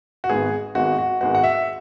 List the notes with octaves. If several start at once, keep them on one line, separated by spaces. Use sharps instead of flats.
F#4
G#1 G#2 G#3 B3 G#4
G#1 G#2 G#3 B3 F#4
F#4
G#1 G#2 G#3 B3 F#4
F#5
E5